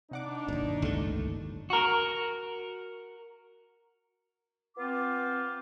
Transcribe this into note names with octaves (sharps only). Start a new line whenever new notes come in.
C3 D4 D#4 F#5 D6
G1 D#2 B2
C#2 F#2 A2 A3
F#4 A#4
B3 C4 F4 D6